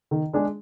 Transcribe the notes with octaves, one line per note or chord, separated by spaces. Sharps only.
D#3
G#3 D4 G#4